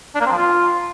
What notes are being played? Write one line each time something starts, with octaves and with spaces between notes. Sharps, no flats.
D4
A#3
C4
F3
F4